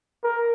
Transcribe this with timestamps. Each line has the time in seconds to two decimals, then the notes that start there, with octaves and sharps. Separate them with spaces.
0.24 A#4